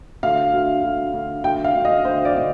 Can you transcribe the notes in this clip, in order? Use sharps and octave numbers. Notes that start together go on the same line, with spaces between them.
D2 F5
D2
D2
D2
D2 G5
F5
D2
D#5
D2 C5
D5
D3